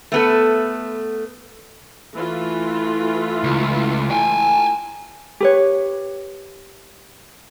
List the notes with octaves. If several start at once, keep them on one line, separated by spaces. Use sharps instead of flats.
A3 B3 A4
E3 A3 F4
C#2
G5 G#5
G4 B4 C#5